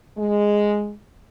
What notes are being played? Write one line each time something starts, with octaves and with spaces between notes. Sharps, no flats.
G#3